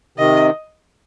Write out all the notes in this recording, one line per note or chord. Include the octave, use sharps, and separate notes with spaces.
C3 D#3 D#5